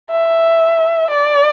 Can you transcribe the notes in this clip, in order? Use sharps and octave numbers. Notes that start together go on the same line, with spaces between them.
E5
D5